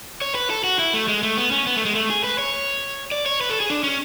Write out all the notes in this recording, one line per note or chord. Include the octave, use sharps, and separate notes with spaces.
C#5
B4
A4
F#4
E4
A3
G#3
A3
B3
C#4
B3
A3
G#3
A3
G#4
B4
C#5
D5
C#5
B4
A4
G#4
D4
C#4